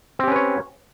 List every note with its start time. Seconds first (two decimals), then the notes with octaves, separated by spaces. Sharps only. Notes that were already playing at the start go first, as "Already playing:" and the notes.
0.19 C4
0.23 G4
0.28 C#4
0.32 B4
0.36 C#5